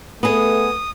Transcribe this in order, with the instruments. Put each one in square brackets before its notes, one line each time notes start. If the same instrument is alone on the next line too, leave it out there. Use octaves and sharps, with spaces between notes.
[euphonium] A3 [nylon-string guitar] B3 G#4 [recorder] D#6